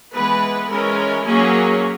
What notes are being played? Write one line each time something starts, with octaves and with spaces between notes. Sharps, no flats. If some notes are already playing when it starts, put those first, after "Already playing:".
E3 G#3 B3 B4
E3 G#3 C#4 A#4
F#3 A#3 C#4 G#4